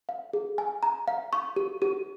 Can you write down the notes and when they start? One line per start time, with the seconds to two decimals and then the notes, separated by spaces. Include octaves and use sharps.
0.09 F5
0.33 G#4
0.58 G#5
0.83 A#5
1.08 F5
1.33 C#6
1.56 G4
1.82 G4